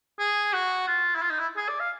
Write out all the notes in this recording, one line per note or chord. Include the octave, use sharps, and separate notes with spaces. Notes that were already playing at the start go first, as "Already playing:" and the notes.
G#4
F#4
F4
E4
F4
D#4
E4
G#4
D5
F5